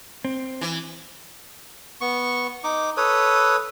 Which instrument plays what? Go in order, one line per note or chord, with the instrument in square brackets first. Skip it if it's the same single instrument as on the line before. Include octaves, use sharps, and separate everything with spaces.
[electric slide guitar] C4
[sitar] E3
[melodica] B3 C#6
D#4 D6
A4 B4 C#5 D#6